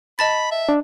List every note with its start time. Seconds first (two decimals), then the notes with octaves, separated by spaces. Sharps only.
0.19 D#5 A5 B5 A6
0.51 E5
0.69 D4